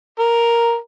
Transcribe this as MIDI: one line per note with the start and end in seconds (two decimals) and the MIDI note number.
0.19 0.77 70